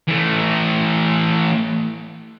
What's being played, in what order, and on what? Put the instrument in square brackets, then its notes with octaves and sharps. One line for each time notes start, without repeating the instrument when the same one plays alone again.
[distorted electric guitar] E3 A3